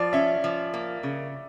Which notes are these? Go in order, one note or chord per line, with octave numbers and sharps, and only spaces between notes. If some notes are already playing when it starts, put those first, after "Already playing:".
Already playing: F3 D5
C#4 E5
F3
A#3
C#3